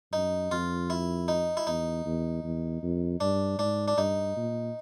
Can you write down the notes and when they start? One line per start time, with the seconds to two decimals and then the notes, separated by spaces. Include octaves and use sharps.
0.13 F#2 D#4
0.51 F2 F4
0.90 E4
1.28 D#4
1.57 E4
1.67 E2 D#4
2.06 E2
2.44 E2
2.83 F2
3.20 G2 D4
3.59 G#2 D4
3.88 D4
3.97 G2 D#4
4.36 A#2